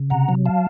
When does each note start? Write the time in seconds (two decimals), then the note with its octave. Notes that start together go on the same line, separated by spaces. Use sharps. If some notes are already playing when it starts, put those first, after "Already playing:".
Already playing: C#3
0.10 C3 F#5 A#5
0.29 F#3
0.45 F5 A5